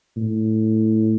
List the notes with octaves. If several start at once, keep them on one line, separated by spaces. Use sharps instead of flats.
A2